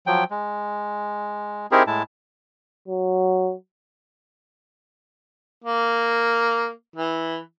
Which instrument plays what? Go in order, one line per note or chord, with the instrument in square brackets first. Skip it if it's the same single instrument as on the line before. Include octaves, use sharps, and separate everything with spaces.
[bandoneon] F3 F#3 G5
G#3
C4 D#4 E4 G4 G#4 A#4
A2 G#3 E4 A5
[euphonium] F#3
[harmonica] A#3
E3